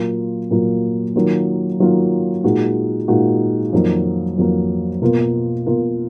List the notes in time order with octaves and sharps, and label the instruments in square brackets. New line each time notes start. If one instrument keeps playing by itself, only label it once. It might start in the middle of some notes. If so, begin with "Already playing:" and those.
Already playing: [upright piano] A#2 F#3 A#3 F4
A#2 F#3 A#3 F4
D#3 F#3 A#3 F4
D#3 F#3 A#3 F4
A#2 G#3 D#4 F#4
A#2 G#3 D#4 F#4
F2 D#3 F#3 A#3
F2 D#3 F#3 A#3
B2 A#3 F4 A#4
B2 A#3 F4 A#4